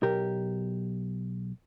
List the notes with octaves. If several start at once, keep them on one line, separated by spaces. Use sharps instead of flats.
B1 G4 A#4